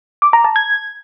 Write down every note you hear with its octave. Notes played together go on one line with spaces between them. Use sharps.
D6
A#5
A5
G#6